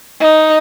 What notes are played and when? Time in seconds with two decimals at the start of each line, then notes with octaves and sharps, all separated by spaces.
0.20 D#4